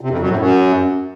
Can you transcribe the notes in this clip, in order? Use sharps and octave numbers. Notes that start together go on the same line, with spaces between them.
C3
F2
F#2
A2
F#2